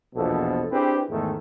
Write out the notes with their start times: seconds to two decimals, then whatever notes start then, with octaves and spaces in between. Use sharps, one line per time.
0.15 A#1 E2 B2 F3 A4
0.71 C4 D4 E4 G4 G#4 B4
1.09 E2 G#2 D#3 G#3 A3